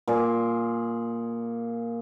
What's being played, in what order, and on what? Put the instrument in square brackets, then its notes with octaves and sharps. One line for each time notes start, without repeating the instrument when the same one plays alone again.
[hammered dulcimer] A#2 G#4